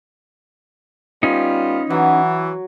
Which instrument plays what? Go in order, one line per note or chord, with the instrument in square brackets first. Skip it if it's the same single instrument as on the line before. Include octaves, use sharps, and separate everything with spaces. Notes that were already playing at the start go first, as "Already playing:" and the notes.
[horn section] G3 B3 F4 [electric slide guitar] C#4 D#4
[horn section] E3 [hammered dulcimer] F#3